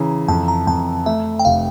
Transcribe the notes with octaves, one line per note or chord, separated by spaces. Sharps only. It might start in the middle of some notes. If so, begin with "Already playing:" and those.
Already playing: C#3 E3 A#5
F2 A5
A#5
F2 A5
A3 E5
G5
F1 F5